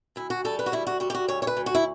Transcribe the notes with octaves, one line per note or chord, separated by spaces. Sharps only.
D2 E4
F#4
G3 A4
B4
F#4
D2 E4
F#4
G3 F#4
G4
F#4
D2 C#5
C#5
B4
D2
F#4
E4